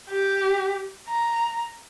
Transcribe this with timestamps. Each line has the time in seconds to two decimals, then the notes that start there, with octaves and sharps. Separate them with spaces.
0.11 G4
1.08 A#5